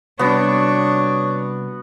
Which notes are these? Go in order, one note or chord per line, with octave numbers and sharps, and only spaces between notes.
C3 G3 B3 D4 D#4 F#4 C#5